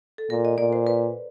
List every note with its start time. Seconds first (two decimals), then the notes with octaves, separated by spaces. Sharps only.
0.18 A4
0.30 A#2 A#4
0.45 D#5
0.58 A#2 D5
0.73 C5
0.87 B4